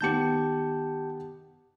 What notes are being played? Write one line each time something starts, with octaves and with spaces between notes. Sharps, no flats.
D#3 B3 G4 A5 G6 C#7